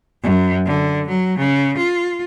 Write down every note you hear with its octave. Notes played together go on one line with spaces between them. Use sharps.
F#2
D3
F#3
C#3
F4